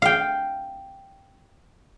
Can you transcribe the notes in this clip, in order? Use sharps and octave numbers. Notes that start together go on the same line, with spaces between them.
F5 G5